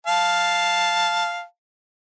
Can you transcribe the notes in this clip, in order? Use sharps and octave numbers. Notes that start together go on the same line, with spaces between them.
F5 A5